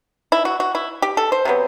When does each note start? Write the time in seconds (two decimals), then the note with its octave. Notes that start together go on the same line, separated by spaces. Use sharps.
0.32 E4
0.45 F#4
0.60 F#4
0.75 E4
1.02 G4
1.17 A4
1.32 C5
1.45 C3 F#3 B3